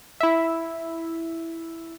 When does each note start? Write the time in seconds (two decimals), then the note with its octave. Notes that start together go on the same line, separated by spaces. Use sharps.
0.20 E4 E5